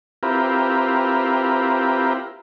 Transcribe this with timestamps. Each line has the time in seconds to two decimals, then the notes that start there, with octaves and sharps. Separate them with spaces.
0.23 C4 E4 F4 G4 A#4 B4